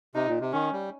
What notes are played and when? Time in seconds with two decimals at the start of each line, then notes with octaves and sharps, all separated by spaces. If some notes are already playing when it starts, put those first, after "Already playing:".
0.15 C3 D#4
0.27 A#2
0.41 C3
0.53 D#3 C#4
0.72 G3